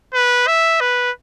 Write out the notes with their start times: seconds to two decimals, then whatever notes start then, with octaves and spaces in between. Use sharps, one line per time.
0.14 B4
0.47 E5
0.81 B4